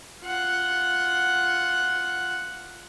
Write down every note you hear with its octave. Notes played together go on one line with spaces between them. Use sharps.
F4 F#5